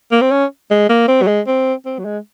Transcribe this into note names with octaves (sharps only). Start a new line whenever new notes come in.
A#3
C4
C#4
G#3
A#3
C4
F#3
G#3
C4
C4
F#3
G#3